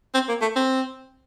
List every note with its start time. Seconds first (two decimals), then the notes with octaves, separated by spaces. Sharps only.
0.14 C4
0.28 A#3
0.41 A3
0.56 C4